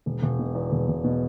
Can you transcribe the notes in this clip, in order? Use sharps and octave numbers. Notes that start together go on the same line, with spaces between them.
E1
E1
B2
E2
E1
E1
B2